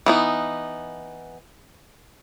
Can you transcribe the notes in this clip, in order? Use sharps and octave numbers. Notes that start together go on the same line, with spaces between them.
E3 B3 D#4